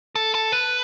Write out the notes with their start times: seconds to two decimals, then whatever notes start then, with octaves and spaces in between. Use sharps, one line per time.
0.15 A4
0.35 A4
0.52 B4